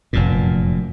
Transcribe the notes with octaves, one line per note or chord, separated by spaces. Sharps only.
F1 F#2 A#2